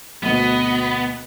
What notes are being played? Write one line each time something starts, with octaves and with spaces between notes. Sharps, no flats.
D2 B2 B3 D#5